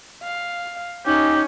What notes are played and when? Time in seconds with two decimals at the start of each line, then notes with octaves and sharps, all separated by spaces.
0.23 F5
1.06 C#4 D#4 G4